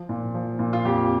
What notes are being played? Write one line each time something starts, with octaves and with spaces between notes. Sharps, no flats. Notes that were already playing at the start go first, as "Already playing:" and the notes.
Already playing: F3
A#2
F3
A#2
F4
F2 G4